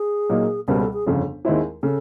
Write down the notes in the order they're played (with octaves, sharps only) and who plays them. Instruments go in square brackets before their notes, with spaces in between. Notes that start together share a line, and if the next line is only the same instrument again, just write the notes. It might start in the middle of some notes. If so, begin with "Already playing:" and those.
Already playing: [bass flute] G#4
[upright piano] A#2 F#3 A#3 D#4
[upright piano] C#2 B2 G3 C4 [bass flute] A#4
[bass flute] A4
G#4
[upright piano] G1 F2 C#3
D#2 D#3 G#3 C4 E4
[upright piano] C#3 [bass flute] A4